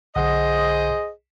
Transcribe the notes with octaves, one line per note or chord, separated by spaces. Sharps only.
B1 D3 G#4 C5 D#5 F#5